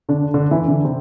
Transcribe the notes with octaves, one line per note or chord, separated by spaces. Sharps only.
D3 D4
D3 D4
E3 E4
D3 D4
C3 C4